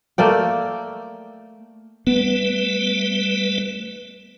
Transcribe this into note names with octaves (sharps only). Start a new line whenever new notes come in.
A3 A#3 D5 G5
G3 A3 B3 B4